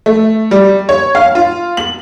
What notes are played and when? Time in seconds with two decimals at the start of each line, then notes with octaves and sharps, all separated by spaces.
0.06 A3
0.51 G3
0.89 C#5
1.15 F5
1.35 F4
1.77 F#7